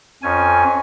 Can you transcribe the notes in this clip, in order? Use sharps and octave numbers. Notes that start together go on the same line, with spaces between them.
F2 C#4 G#5